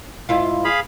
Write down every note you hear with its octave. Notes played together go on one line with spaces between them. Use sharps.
G#2 E4 F4
G#4 F5 B5